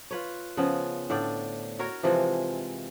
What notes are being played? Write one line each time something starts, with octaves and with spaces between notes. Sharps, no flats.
F4 B4 C#5
C#3 F3 B3
A2 D3 D5 G5
F#4 A#4 C#5
C3 E3 F3 G#3